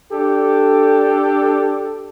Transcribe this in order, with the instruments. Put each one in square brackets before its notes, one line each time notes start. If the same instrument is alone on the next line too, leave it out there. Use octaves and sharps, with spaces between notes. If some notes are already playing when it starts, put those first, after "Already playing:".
[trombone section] D4 G4 A4